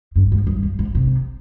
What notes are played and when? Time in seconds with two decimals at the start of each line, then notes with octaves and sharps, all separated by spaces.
0.16 G2
0.32 G#2
0.47 G2
0.63 G2
0.79 G#2
0.95 C3